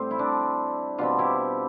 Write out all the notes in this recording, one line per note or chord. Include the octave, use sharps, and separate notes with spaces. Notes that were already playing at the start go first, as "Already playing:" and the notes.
Already playing: A2 G3 C4 G4
E4
D4
B2 G3 C4 D4 F4
E4 G4